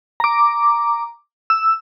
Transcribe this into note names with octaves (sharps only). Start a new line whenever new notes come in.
A#5 D6
E6